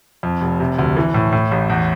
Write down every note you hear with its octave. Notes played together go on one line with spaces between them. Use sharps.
F2
F1
C3
D2
E3
A2
A2
A1
E2